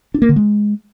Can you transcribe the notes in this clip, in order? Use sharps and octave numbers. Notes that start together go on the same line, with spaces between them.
D4
A#3
D3
G#3